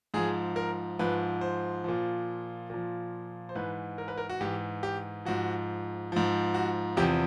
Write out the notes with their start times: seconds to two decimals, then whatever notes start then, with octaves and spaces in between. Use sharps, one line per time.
0.14 G#2 F3 G#4
0.56 A#4
0.99 G#2 F3 B4
1.41 C5
1.84 A#2 F3
2.70 A#2 F3
3.49 C5
3.55 G#2 E3 B4
3.98 A#4
4.08 B4
4.18 A#4
4.29 F#4
4.41 G#2 E3 G4
4.83 G4
5.25 G#2 F3 F#4
6.12 G#2 F3
6.54 F#4
6.97 E2 C3 F3 G4